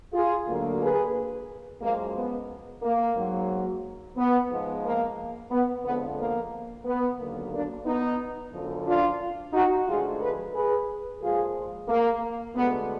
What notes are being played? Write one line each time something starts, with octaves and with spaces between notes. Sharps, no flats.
F4 G#4
D2 D3 F#3 A#3
G#4 B4
F#2 F3 G#3 A#3
B3
A#3
G#2 F#3 A#3
B3
G#2 F3 G#3
A#3
B3
F2 D3 F3 G#3 B3
A#3
B3
D#2 D3 F#3 A#3
A#3 D4
B3 D#4
F#2 D3 F3
D4 F4
D#4 F#4
D2 D3 F3 G#3 F4 G#4
G#4 B4
G#4 B4
A#2 F3 G#3 F4 G#4
A#3
D2 D3 G#3 B3